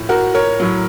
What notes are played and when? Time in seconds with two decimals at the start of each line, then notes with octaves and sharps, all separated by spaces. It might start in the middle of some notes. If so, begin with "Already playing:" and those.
Already playing: A2 F3
0.09 F#4 A#4
0.35 A#4 C#5
0.60 A2 F#3